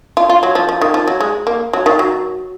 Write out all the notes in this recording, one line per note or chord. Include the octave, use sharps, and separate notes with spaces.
F4
F4
F#3
F3
F3
D#3
F3
F#3
G#3
A#3
F#3
D#3
F#3